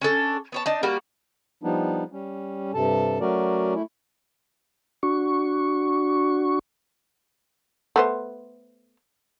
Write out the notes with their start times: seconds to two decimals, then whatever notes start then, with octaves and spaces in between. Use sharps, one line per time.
0.02 C#4 D4 A4
0.52 B3 C#5 A5
0.66 D4 D#4 A5
0.83 G3 A#3 F#4
1.64 F3 G3 B3 D4 D#4
2.12 G3 C#4
2.74 G2 C3 A4 A5
3.21 F#3 A3 C#4 F#4 A#4 D5
3.75 A3 E4
5.03 D4 F#4 C#6
7.96 A3 B3 C5